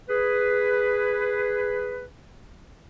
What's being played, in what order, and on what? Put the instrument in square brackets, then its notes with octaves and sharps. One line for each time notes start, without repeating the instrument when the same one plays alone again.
[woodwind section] G#4 B4